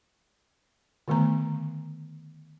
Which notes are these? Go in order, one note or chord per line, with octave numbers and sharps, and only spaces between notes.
D3 D#3 A3 B3 A#5